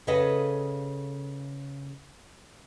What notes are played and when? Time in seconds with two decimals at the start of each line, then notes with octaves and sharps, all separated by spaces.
0.07 C#3 G#4 A4 B4 D#5 F5